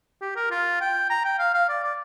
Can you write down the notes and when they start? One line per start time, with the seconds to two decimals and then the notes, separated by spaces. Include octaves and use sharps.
0.21 G4
0.36 A#4
0.51 F4
0.81 G5
1.10 A#5
1.25 G5
1.39 F5
1.54 F5
1.69 D5
1.84 D5